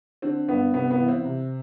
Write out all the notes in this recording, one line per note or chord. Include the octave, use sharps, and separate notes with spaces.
D3 C4
G2 B3
C3 B3
B3
E3
C4
C3